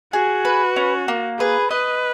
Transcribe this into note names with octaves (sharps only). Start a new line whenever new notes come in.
F#4 G#4
B4
C#4
A#3
G#4 B4
B4 D#5